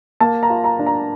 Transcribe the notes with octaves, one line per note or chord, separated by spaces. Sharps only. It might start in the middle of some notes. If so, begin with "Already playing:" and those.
A#3 A5
A#5
F4
A#5
D4
A#5